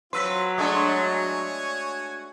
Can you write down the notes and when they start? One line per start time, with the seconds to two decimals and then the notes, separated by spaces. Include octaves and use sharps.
0.13 F#3 C4 F4 B4 C6 E6 B6
0.58 G#3 A3 D4 F#4 C#5 G#5 A5 D#6